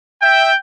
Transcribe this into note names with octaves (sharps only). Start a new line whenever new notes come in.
E5 G5